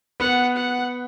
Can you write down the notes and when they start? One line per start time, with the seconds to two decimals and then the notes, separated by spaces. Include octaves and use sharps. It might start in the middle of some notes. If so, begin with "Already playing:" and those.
0.20 B3 F#5
0.57 F#5